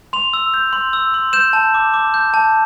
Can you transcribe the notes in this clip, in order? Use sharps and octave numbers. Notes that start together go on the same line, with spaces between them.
C6 F7
E6
G6
C6
E6
C6
G6 E7
A5
D6
D6
G6
A5